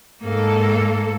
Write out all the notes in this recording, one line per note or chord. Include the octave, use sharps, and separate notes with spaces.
G#2 A#3 A4